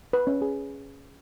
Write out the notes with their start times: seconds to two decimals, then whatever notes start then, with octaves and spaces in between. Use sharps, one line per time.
0.13 B4
0.27 C#4
0.42 G#4